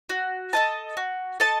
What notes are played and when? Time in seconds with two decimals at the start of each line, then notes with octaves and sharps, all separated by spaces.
0.09 F#4
0.53 A4 D#5 A5
0.97 F#4
1.40 A4 D#5 A5